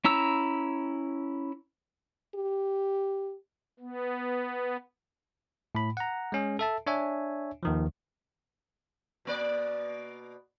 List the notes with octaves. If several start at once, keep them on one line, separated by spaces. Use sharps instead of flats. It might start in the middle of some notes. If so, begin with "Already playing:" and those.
C#4 E4 A#5 E6
G4
B3
A2 B5
F#5 A#5
G#3 C#4 G#4
A4 E5 A5
D4 C#5 E5 G#5
D#2 D#3 F3
B2 A#3 D5